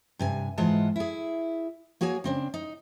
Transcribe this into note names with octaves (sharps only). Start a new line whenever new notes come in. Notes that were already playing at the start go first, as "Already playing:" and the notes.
G2 C3 G#5
G#2 E3 G#3 F4 F#5 A5
E4 G#4
A#3 F#4 G#4 C#5 G#5
C#3 C4 D4
D#4